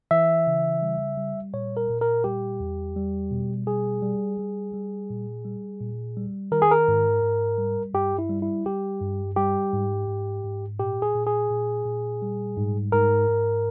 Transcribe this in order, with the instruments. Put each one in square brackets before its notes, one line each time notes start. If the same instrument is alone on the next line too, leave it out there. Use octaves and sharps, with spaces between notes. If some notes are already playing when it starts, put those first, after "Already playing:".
[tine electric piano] E3 E5
C#3
G3
G3
A#2 C#5
A#4
A#2
A#4
G3 G4
E2
G3
B2
G3 G#4
G3
G3
G3
A#2
G3
A#2
G3
D#3 A#4
G#4
A#4
G#2
G#2
G3
G2 G4
E4
G3
E4
G3 G4
G2
G3 G4
G#2
G#2
G#2
A#2 G4
G#4
A#2
G#4
A#2
A#2
G3
G#2
G#2 A#4
G#2